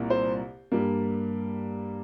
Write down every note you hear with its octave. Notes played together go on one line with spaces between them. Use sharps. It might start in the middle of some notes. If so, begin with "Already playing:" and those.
Already playing: C2 A#2 A#3
C5
G2 G3 A#3